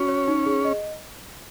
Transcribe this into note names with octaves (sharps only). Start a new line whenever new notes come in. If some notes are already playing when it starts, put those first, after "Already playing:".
Already playing: C#4 F#4
C#5
D#4
G#4
D#5